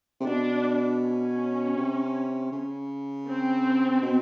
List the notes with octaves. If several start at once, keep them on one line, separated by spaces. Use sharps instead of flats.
C3
B2 D4
C#4
C3
C#3
C4
B2